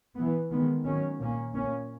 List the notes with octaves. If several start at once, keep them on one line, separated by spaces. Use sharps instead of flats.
E3 B3
D#3 G#3 B3
D#3 F#3 C#4
A#2 A#3 C#4
A#2 A#3 C#4